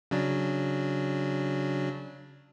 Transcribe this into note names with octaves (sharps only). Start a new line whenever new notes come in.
C#3 F#3 D4